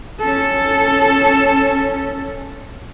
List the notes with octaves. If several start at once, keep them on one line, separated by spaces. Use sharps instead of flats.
C#4 A4